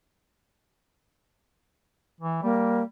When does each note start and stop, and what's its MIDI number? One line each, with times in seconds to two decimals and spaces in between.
2.21 2.40 52
2.43 2.82 55
2.43 2.83 58